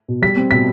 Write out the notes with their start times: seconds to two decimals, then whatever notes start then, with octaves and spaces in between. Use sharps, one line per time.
0.08 B2
0.22 G3 B6
0.36 C4
0.51 B2 B6